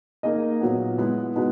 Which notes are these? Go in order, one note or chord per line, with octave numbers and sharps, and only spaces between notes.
A#3 D#4 G#4 D#5
A#2 F#3 B3
G#3 B3 E4
B2 G#3 B3 D#4